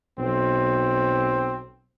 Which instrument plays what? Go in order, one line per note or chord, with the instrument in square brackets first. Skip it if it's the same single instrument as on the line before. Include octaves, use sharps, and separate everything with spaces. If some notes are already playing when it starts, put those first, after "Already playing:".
[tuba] B1 [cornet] C4